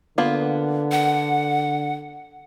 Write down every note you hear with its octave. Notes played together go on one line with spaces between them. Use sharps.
D3 A#3 B3 F4
F#5